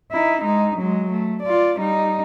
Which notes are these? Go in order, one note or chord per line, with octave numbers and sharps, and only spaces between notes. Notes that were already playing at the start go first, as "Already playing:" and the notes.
D#4 E4
G#3 D#4
F#3 G#3
A3
F4 D5
G3 D#4